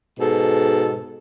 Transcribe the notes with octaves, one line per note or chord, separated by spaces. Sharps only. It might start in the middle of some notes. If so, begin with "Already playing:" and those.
G#2 B2 A4